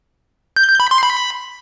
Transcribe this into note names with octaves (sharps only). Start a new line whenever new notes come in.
G6
G6
B5
C6
B5